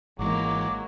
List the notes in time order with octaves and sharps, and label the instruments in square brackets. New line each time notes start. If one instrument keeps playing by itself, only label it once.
[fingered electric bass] G#1 E3 [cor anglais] F#3 [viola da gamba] G#3 A#3 [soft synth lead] D6